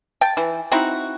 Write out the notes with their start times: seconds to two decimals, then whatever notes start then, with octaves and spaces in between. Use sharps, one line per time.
0.21 G5 A5
0.37 E3
0.72 C4 D#4 E4 F#4